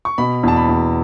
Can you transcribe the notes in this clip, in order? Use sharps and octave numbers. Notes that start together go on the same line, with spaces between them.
C#6
B2 B5
E2 A5
B5
E2